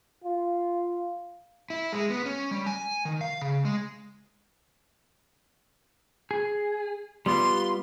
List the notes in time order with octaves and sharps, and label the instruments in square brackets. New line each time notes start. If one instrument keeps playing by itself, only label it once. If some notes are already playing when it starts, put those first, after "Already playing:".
[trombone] F4
[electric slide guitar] E4
G#3
B3
C#4
G3
G#5
D#3
F5
C#3
G#3
G#4
[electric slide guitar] G3 B3 F4 [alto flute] C6